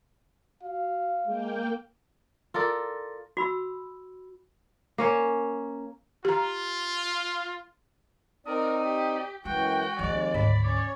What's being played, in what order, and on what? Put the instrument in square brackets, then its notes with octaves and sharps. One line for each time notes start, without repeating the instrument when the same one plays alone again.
[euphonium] F#4 [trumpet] F5
[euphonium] G#3 [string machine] A#3 G5
[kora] F4 A4 A#4 D5
[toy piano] F#4 B5 E6
[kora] A#3 C#4 C#5
[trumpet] F4 [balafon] G4 A#5
[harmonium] C4 D#4 D5 [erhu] A#4 [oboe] D#6
[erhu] G4
[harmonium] F#2 E3 [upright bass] G#3 [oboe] F#4 [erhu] G5
[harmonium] D#2 G#3 [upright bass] F3 C4 [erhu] D5
[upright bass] D2 G#2 [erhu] D5 [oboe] B5
[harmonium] C#4 [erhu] C#5 [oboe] D5